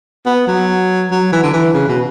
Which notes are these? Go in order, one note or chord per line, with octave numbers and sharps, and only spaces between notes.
B3
F#3
F#3
E3
D3
E3
C#3
B2